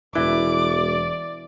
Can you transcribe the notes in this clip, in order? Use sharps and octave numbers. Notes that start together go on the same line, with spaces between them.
E1 E3 D5 D6